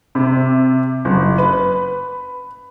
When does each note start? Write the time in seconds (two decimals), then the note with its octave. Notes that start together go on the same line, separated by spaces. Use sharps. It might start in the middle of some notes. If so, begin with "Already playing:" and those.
0.15 C3
1.05 F#1
1.38 B4